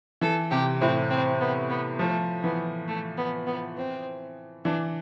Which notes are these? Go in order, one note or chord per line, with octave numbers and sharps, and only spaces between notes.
E3 A4
C3 G4
A2 C4
C4
B3
B3
F3 A3
E3 B3
A3
B3
B3
C4
E3 D4